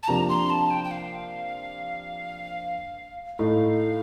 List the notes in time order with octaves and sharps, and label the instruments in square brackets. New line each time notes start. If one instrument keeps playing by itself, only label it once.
[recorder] A5
[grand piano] C3 F3 A#3 D4 G4 [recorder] A#5
[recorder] C6
A5
G5
G5
F5
[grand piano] A2 A3 D#4 [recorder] F5